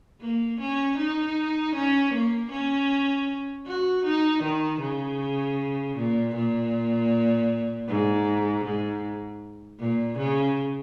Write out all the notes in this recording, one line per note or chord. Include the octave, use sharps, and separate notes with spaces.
A#3
C#4
D#4
C#4
A#3
C#4
F#4
D#4
D#3
C#3
A#2
A#2
G#2
G#2
A#2
C#3